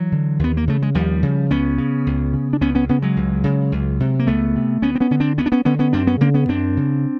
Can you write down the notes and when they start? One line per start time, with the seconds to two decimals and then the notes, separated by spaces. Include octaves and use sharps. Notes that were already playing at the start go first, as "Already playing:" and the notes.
Already playing: E3 F#3
0.12 D3
0.39 D#2 B3
0.57 A#3
0.68 C#3 A3
0.82 G#3
0.95 D#2 F3 G3
1.23 C#3
1.50 C#2 B3 C#4
1.78 C#3
2.07 C#2
2.33 C#3
2.53 D4
2.61 C#2 B3 C#4
2.75 B3 C#4
2.89 C#3 B3 C#4
3.02 F#3 G#3
3.17 C#2
3.44 C#3
3.72 C#2
4.00 C3
4.19 A#3
4.27 C#2 A3 B3
4.56 C3
4.82 D2 B3 C#4
4.95 C4
5.00 B3 C#4
5.11 D3 C#4
5.20 C4 D4
5.38 D2 B3 C#4
5.46 D4
5.52 B3 C#4
5.65 D3 B3 C#4
5.79 B3 C#4
5.93 F#2 C4 D4
6.07 B3 C#4
6.21 C#3 A#3 C4
6.34 B3 C#4
6.49 F#2 C4 D4
6.77 C#3